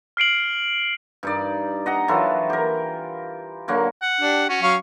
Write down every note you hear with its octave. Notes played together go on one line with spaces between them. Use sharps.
F6 C7 D7 F#7
G2 D#4 D5
D#5 F#5 A#5
E3 F#3 F4 A4
G4 A#4
D3 F#3 A#3 F#4
F#5
D4 G4
C#4 F#4
F#3 F5 C#6